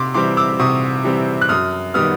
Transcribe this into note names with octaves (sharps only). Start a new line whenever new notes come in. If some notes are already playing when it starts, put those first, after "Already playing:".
Already playing: C3 C6 D6
E3 G3 C4 C6 D6
D6 E6
C3 C#6 D#6
E3 G3 C4
F#6
F#2 D#6 F6
D#3 G3 B3 D#6 F6